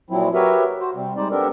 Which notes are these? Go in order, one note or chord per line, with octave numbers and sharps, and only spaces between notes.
A#2 F3 F#3 C4 E4
F#4 G4 A#4 B4 C#5 E5
F#4 C5
C3 G3 C4
G3 G#3 D#4 C5 D5
B3 C4 D4 G4 A4 A#4